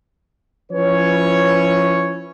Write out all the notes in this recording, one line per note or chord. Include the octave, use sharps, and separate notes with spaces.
F3 C#4 E4 B4 C#5